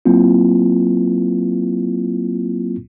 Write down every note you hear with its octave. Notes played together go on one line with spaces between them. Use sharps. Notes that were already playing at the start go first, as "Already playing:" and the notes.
F#3 A#3 C4 E4 F4